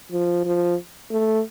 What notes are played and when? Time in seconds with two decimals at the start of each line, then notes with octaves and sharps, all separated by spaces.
0.12 F3
0.45 F3
1.11 A3